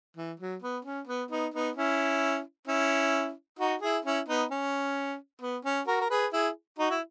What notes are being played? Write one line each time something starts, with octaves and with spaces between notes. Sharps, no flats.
E3
F#3
B3
C#4
B3
B3 D#4
B3 D#4
C#4 E4
C#4 E4
D#4 F#4
E4 G#4
C#4 E4
B3 D#4
C#4
B3
C#4
F#4 A#4
A#4
G#4 B4
E4 G#4
D#4 F#4
E4